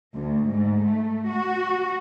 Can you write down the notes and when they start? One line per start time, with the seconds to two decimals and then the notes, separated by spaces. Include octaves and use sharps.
0.17 D2
0.49 G#2
0.86 A3
1.32 F#4